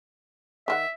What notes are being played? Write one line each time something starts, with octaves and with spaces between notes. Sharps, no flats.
D#3 F4 E5 F#5